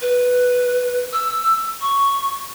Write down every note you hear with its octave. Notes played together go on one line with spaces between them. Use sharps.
B4
E6
C#6